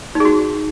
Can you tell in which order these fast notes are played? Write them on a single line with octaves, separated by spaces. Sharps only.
D#4 G#4 F#4